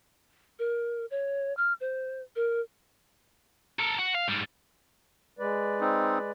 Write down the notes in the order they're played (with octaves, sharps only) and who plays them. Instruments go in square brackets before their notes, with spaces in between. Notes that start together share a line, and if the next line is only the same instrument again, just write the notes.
[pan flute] A#4
C#5
F6
C5
A#4
[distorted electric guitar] A4 A#4
F#4
F5
G#2 G3
[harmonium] G#3 B4 D5
[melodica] C4 D#4